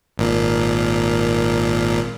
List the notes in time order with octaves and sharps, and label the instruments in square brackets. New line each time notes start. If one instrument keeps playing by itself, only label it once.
[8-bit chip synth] G#1 A#2